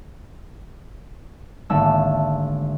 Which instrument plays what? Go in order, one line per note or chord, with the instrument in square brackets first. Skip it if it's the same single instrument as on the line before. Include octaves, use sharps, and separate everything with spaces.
[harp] G#1 D3 A3 A#3 E6